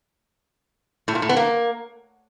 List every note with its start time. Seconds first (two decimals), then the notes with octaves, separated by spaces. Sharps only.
1.08 A2
1.15 A#2
1.22 A2
1.29 B3
1.37 A#3